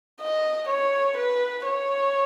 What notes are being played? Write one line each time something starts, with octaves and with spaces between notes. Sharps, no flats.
D#5
C#5
B4
C#5